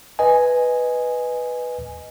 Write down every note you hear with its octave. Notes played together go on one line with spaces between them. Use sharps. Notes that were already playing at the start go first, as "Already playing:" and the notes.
B4 D#5 G#5